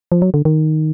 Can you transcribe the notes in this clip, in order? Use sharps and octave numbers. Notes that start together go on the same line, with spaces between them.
F3
F#3
D3
D#3